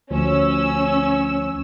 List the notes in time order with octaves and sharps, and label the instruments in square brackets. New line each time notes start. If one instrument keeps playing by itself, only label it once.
[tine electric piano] D2 F3 [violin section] C#4 E6